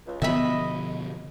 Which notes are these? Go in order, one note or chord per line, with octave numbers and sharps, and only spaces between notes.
C#2
B2 D3 F3 B3 D#5 E5 B5